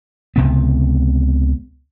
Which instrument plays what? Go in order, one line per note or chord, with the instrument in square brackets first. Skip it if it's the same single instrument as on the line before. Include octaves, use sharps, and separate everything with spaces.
[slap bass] C#2 C3 B3